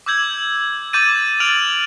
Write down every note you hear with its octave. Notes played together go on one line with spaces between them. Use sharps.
D6 E6 G6 G#6 F#7
D6 G6 A6 D#7
F6 A6 D7 F7 F#7